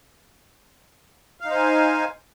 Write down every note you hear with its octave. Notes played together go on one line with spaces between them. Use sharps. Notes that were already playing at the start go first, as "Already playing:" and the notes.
D#4 C5 F5 G#5